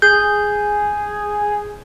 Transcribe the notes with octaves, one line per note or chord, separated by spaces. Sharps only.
G#4 G6